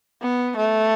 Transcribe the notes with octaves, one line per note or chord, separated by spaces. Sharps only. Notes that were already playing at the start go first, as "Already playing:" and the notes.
B3
A3